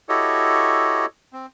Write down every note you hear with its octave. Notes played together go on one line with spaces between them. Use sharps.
E4 F#4 G4 A4 C#5 D#5
C4